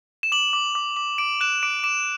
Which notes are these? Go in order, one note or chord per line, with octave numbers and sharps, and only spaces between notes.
E7
D6 F#7
D6
D6
D6
D6 D7
F#6 E7
D6 D7
D6 E7